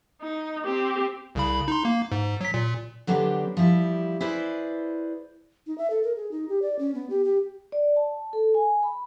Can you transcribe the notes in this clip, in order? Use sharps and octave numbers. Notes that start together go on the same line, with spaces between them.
D#4
C4 G4
C2 C#3 B5
D#4 C6
A#3
G#2
F#3 B6
A#2
D3 F#3 B3 D4 G4 C5
F3 G3 E4 G4
E4 G#4 B4 C5 D5
D#4
E5
A4
A#4
G#4
D#4
G4
D5
C#4
B3
G4
G4
D5
A5
A4
G#5
B5